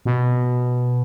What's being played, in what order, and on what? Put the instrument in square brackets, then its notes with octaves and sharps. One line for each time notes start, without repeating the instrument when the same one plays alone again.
[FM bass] B2